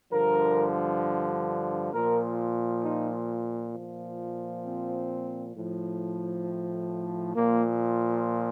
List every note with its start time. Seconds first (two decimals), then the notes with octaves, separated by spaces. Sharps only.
0.12 G2 D3 F3 A#4
1.92 A#2 F3 A#4
2.83 D#4
3.73 A#2 F3
4.64 C4
5.54 A2 F3
7.35 A#2 F3 A#3